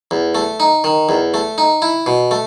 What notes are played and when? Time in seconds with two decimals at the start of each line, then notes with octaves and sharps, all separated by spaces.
0.11 E2
0.35 A3
0.60 D#4
0.84 D#3
1.09 E2
1.34 A3
1.58 D#4
1.82 E4
2.06 B2
2.31 A3